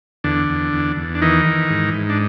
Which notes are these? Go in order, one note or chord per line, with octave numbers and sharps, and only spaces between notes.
E2 D3 D4
E2
E2
E2
D4
D#3 E3 D#4
E3
G#2
G#2
D4